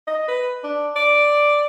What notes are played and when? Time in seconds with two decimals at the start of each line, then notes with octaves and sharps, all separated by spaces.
0.07 D#5
0.27 B4
0.63 D4
0.96 D5